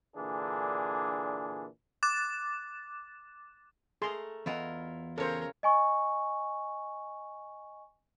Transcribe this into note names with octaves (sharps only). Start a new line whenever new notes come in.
A#2 D3 E3 D4 G#4
D6 F#6 A6 E7
A3 G#4 A#4 C6
E2 E4 F4 A#4 D#5 F#5
C#3 A4 A#4 C5 C#5
D#5 G#5 C#6